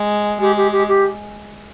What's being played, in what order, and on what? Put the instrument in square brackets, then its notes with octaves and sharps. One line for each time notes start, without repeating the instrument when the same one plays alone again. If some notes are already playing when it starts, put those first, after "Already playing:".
Already playing: [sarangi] G#3
[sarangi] G#3 [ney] G4
[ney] G4
G4
G4